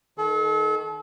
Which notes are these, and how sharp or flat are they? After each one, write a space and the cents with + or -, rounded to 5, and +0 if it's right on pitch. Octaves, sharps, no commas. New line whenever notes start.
D#3 +0 A4 -40